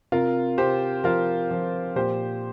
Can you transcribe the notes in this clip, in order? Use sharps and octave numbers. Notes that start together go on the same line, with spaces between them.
C3 F4 A#4
C3 G4 C5
F3 F4 A#4
F3
A#2 G4 C5